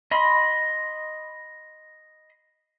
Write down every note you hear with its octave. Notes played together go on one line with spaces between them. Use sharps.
D#5 B5 C6